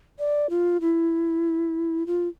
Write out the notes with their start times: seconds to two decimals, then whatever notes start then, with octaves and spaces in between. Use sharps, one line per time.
0.19 D5
0.50 F4
0.81 E4
2.06 F4